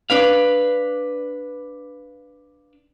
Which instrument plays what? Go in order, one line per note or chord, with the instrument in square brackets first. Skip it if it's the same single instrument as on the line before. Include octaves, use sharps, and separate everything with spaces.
[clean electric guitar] D4 B4 F5